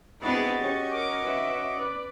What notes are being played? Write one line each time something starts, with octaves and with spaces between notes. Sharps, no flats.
B3 C4 D4 E4 F#4 G#4 D#5 A6
C#4 G4 C#5
A#4 D6
B4 E5
B4 D5